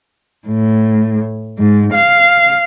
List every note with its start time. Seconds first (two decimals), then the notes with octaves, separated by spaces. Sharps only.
0.46 A2
1.58 G#2
1.93 F5